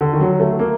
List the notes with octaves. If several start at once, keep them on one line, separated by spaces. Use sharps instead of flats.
D3
D#3
F#3
A3
A#3